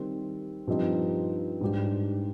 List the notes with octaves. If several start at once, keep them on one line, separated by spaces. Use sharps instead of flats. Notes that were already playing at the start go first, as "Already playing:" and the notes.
Already playing: D#3 G3 C4
G2 F3 C4 D#4 G4
G#2 G3 D4 G4